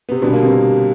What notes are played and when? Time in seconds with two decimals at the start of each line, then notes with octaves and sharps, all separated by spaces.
0.09 B3
0.11 C3 C4
0.22 B2 D3 G3 B3
0.33 A#3
0.42 C3 C4